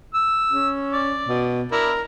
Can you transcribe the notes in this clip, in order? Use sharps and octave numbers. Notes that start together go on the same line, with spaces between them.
E6
C#4
D5
B2
D4 E4 A#4